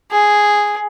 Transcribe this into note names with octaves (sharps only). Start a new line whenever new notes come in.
G#4